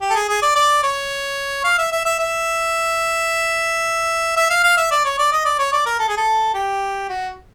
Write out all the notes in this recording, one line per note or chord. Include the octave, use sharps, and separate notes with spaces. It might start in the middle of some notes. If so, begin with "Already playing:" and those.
G4
A4
G#4
G#4
D5
D5
C#5
F5
E5
E5
E5
E5
E5
F5
F5
E5
D5
C#5
D5
D#5
D5
C#5
D5
A#4
A4
G#4
A4
G4
F#4